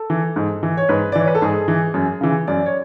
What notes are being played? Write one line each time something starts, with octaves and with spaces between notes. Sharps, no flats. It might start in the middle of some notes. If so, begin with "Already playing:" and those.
Already playing: A4
E3
G#2
E3
C#5
G#2 B4
D5
E3 C#5
B4
A4
G#2 G#4
E3
F#2
C#3 E3
F#2 D5
C#5